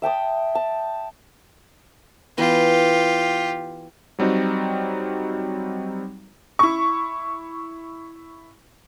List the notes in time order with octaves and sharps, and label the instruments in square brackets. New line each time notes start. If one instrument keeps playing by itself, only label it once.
[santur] E5 G5 A5 D#6
A5
[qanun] E3 B3 D#5 [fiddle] F4 G4
[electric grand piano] F#3 G3 C4 D#4 F#4
[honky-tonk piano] E4 C#6